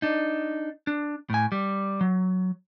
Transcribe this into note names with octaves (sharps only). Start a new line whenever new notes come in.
D4 D#4
D4
A2 G#5
G3
F#3